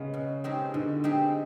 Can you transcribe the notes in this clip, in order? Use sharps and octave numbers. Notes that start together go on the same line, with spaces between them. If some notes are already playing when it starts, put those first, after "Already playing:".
Already playing: C#3 G#3 B3
B2
G#3 C4 D#4 G4
B2 D3
G#3 C4 D#4 G4